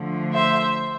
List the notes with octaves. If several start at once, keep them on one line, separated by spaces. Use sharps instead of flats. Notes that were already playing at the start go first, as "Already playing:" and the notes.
Already playing: D3 F3 A3
C5 E5